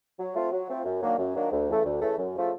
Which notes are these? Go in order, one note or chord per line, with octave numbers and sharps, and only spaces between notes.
F#3
A3 C4 F4
F#3
A3 C4 F4
F#2
D#3 F#3 A#3 D4
F#2
D#3 F#3 A#3 D4
D2
C#3 E3 A3
D2
C#3 E3 A3
F#2
C#3 F3 A3